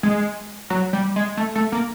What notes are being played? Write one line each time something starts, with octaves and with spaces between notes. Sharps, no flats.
G#3
F#3
G3
G#3
A3
A3
A#3